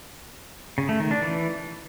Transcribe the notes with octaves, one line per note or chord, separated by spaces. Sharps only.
C#3
A3
D#3
D4
E3